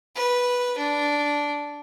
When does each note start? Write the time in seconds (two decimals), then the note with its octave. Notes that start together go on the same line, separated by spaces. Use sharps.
0.15 B4
0.77 D4